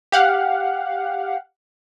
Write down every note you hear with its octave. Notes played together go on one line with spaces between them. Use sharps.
G4 F5 F#5